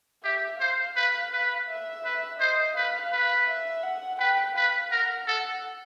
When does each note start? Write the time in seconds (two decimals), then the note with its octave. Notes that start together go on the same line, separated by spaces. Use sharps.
0.24 G4 E5
0.60 C5 F5
0.96 B4
1.32 B4
1.68 E5
2.05 B4
2.40 C5 D#5
2.76 B4 F5
3.12 B4
3.48 E5
3.83 F#5
4.19 B4 G5
4.56 B4 F5
4.92 A#4 F#5
5.27 A4 F#5